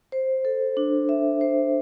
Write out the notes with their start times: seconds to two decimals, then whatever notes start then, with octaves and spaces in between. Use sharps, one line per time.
0.12 C5
0.45 A4
0.77 D4
1.09 E5
1.41 C5